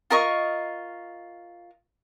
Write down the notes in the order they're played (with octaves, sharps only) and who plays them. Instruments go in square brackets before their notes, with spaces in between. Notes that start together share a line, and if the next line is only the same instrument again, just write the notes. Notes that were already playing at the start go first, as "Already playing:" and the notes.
[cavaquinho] F4 A#4 D#5 C#6